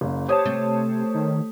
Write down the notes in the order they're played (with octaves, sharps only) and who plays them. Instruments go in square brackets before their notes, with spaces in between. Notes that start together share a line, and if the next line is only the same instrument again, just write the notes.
[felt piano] F#1 C#3
[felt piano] G4 D#6 [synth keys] C5 C#5 A5
[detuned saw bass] C3 [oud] A3
[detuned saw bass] D#3